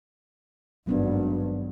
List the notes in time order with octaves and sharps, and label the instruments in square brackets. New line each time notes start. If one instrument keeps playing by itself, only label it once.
[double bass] G#1 G2 [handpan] F#3 B3 D4